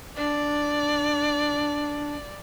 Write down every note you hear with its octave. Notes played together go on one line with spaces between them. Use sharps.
D4 D5